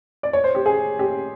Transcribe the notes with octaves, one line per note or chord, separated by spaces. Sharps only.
D5
C#5
C5
G4
G#4
G4